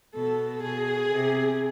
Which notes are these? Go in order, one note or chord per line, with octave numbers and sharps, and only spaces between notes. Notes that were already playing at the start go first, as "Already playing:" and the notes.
B2 A4
B2 G#4
C3